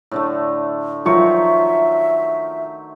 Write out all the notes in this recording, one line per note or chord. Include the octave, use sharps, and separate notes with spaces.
A2 D3 A3
D#3 F3 F#3 C5 E5 C#6